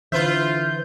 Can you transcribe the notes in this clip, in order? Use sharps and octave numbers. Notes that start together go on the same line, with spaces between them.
D3 E3 F4 B4 C5 E5 G6